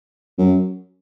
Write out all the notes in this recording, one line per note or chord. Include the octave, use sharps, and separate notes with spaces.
F#2